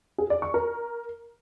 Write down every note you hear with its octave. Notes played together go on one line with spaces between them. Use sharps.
G#4
D5
C#6
A#4